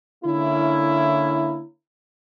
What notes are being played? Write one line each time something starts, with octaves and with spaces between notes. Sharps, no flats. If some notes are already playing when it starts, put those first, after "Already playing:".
D3 A#3 C#4 E4